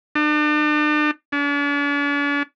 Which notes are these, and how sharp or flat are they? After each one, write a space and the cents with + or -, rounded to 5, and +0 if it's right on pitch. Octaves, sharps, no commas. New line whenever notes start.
D4 +40
D4 -45